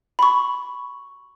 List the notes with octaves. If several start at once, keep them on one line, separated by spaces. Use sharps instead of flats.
B5 C#6